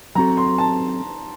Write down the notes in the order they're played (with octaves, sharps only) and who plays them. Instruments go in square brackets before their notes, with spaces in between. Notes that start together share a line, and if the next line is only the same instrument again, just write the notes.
[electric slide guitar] F#3 C4 F#4 A4 [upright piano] A#5
[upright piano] C6
A5